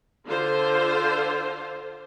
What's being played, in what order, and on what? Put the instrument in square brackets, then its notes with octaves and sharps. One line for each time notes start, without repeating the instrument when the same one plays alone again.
[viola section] D3 F4 C5